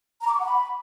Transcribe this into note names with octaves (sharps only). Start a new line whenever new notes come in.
A#5
D6
C#6
F#5
B5